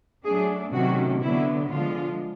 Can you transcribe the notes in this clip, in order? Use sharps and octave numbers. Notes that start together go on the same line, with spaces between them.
F#3 A3 D4 G#4
C3 D#3 F#3 A3 C#4 F#4
D3 F#3 B3 E4
D3 F3 G#3 F4